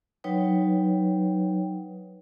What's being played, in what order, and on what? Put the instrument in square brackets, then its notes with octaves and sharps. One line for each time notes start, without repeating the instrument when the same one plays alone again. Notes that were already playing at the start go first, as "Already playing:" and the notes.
[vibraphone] F#3 D#4 B4 C#5 G5